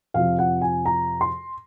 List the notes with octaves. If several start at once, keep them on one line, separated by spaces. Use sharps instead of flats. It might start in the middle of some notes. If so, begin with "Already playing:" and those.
F2 C3 F3 F5
F#5
G#5
A#5
C6